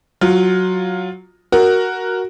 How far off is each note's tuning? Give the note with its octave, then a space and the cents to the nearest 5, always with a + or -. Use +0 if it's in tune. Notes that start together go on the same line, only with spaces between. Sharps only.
F#3 +0 F4 +15
F#4 +5 A#4 +0